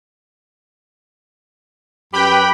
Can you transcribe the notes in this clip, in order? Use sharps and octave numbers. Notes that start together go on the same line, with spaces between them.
F#2 G4 B4 G5 B5